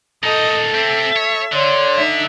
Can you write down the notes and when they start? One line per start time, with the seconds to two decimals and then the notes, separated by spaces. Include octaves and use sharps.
0.23 A#2 D#4 A4 D#5
0.74 C4 G4 E5
1.16 C#5
1.53 D3 C#5 D5 C6
1.97 D#4 E5